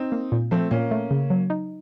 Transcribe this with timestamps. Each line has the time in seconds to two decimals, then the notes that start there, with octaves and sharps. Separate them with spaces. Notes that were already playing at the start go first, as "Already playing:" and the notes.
Already playing: C4 D#4
0.12 A#3
0.32 A#2
0.51 F3 A3 C4
0.71 A#2 A#3 C#4
0.91 A3
1.11 C#3
1.30 F#3
1.50 D#4